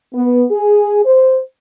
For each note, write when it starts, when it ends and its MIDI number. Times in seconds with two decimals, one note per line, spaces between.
0.14 0.44 59
0.51 1.03 68
1.05 1.40 72